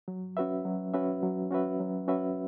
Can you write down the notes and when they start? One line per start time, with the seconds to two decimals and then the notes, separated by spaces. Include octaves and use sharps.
0.08 F#3
0.37 C#4 F#4 B4 E5
0.65 F#3
0.94 C#4 F#4 B4 E5
1.23 F#3
1.51 C#4 F#4 B4 E5
1.80 F#3
2.08 C#4 F#4 B4 E5